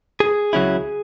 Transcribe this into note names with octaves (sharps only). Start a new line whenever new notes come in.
G#4
C#2 C#3 F#3 C#4 E4